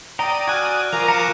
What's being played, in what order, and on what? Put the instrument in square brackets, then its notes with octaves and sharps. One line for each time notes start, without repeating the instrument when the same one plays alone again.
[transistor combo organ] D5 D#6 [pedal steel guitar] G5 A#5
[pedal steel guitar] F#4 G#5 [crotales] F6 F#6 G#6
[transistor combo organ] F3 A#4 D6 [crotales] C#6 D#7 F7
[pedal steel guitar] G#5 A#5 [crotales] C#7 E7